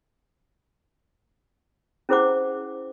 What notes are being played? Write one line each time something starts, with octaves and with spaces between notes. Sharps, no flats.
C#4 E4 G#4 C5 F#5 D6